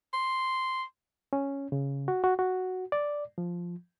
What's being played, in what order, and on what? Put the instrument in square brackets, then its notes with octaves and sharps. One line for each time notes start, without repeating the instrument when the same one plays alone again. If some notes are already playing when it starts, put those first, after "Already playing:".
[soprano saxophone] C6
[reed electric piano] C#4
C#3
F#4
F#4
F#4
D5
F3